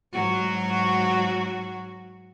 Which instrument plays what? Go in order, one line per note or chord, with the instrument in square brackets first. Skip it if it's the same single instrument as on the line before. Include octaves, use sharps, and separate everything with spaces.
[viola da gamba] G#2 F#3 F#4